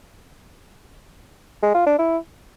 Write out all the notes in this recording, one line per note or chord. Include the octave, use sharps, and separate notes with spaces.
G#3
F4
D4
E4